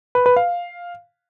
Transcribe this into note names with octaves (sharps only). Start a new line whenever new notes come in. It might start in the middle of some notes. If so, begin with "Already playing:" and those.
B4
B4
F5